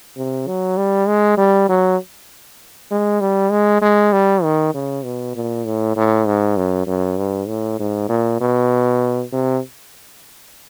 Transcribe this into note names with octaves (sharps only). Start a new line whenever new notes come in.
C3
F#3
G3
G#3
G3
F#3
G#3
G3
G#3
G#3
G3
D#3
C#3
B2
A#2
A2
A2
G#2
F#2
F#2
G2
A2
G#2
A#2
B2
C3